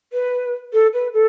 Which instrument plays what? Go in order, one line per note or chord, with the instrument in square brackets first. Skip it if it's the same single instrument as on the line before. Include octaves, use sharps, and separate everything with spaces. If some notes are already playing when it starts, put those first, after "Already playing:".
[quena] B4
A4
B4
A4